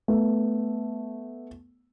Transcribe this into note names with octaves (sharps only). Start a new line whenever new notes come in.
A3 B3